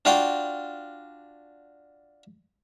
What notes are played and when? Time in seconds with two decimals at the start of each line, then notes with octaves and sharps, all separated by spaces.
0.05 D4 F4 F#4 F5 G5